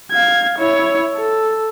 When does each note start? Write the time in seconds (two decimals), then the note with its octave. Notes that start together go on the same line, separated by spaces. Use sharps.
0.12 F5 G#6
0.59 E4 C#5
1.15 A4